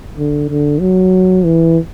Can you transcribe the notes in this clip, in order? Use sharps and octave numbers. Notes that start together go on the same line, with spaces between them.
D3
D3
F#3
E3